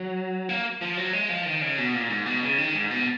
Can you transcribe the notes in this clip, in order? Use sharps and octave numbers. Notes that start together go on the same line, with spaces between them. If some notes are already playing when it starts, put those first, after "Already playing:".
Already playing: F#3
A#3
F3
F#3
G#3
F3
D#3
C#3
B2
A#2
G#2
B2
C#3
D#3
G#2
B2